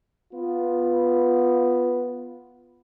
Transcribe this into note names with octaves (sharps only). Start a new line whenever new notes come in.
B3 F4